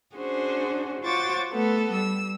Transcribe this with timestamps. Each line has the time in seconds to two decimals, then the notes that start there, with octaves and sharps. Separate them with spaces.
0.16 C#4 D4 F#4 G#4 C5
1.01 F4 F#4 C5 C#5 D6 A6
1.52 A3 B3 A4
1.91 G3 E6